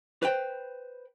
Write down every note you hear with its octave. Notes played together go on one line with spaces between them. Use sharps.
B4 C5 G5